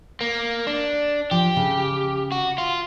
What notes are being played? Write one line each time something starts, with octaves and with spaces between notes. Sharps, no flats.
A#3
D4
F3 G4
C#3
F#4
F4